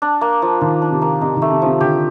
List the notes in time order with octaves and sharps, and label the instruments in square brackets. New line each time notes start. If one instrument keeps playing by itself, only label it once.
[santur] D4
A#3
F3
[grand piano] D#3 [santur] F4
[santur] D4
[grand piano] C3
[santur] A#3
[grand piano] C3 [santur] D#4
[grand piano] D#3
[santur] A3
[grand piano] C3
[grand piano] C3 [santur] F3
[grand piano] D3 [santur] G4